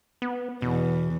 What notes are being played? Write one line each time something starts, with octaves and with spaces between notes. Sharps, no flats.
B3
E2 B2